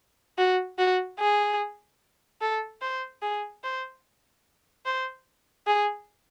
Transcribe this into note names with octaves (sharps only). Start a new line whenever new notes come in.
F#4
F#4
G#4
A4
C5
G#4
C5
C5
G#4